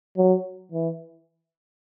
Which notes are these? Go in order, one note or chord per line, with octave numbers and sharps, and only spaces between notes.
F#3
E3